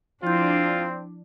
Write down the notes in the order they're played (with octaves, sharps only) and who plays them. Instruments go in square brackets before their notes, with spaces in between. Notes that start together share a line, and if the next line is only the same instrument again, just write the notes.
[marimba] F3 E4 G6 [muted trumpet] C4 [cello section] D4 [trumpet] F4